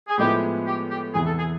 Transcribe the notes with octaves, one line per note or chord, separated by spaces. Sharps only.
G#4
A2 F3 G#3 B3 E4 G4
G4
G4
E2 C3 E3 G#4
A4
G#4